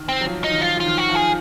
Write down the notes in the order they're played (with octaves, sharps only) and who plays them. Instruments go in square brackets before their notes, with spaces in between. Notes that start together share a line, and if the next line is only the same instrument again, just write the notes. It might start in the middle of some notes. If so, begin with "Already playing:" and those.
Already playing: [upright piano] D#3
[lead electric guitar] C4
[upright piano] F#3
F3
[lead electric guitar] D#4
[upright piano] D#3
[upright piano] F3 [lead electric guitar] F4
[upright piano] F3 [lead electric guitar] F4
[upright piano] D#3
[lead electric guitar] F#4
[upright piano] F3
[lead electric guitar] G#4